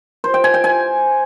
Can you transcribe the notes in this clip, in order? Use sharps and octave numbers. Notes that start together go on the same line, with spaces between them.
C5
G5
G#5
G5
G#5